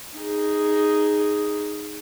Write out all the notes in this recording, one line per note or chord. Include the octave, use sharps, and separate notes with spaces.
D#4 G#4